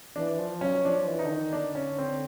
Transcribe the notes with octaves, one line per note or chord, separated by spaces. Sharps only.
E3 D4
F3
F#3 C#4
F3 D4
F3
E3
D#4
D3
D#3
D3 D4
C#4
C4